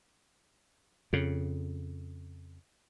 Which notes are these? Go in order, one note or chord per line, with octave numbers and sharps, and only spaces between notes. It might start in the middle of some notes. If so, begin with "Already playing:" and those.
F2 C#3